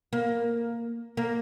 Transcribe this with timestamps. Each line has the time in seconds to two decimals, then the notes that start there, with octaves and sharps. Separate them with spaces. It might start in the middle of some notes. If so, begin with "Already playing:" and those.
0.13 A#3
1.17 A#3